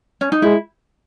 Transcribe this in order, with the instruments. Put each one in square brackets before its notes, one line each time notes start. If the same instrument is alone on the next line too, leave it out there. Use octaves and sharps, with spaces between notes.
[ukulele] C#4
D#4
[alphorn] G#3 [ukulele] E4